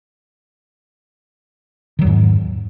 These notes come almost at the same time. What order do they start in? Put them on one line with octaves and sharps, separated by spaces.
D#3 F#3 E2 G#2